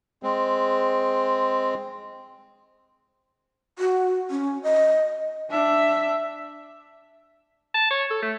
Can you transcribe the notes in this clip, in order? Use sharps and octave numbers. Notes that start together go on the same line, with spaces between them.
G#3 C4
F#4
C#4
D#5
D4 E5
A5
C#5
A4
A3